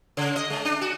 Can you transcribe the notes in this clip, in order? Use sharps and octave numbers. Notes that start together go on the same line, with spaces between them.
C#3
D#5
G#3
D4
F#4